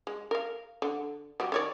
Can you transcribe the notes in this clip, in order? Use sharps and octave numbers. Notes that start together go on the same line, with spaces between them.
G#3
A#4 F5
D3
F#3 G3 G4
D#3 C#5 D5